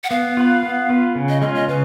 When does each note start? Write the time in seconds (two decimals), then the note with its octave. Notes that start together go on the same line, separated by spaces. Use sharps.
0.04 F#5
0.10 B3 F5
0.37 F4 B4
0.63 B3
0.89 F4 B4
1.15 C#3
1.29 D#5
1.42 G#3 C#4 F4 D#5
1.55 D#5
1.68 C#3 B4